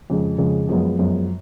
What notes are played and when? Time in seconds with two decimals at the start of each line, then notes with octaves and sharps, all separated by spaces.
0.10 F2 C#3 G#3
0.38 F2 C#3 G#3
0.69 F#2 F3 G#3 B3
0.99 F#2 F3 G#3 B3